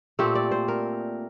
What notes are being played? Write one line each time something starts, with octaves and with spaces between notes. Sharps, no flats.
A#2 A3 C4 G4
D5
C5
A#4